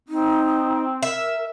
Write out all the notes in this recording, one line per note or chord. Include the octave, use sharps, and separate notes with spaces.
C4 D#4
A#4 E5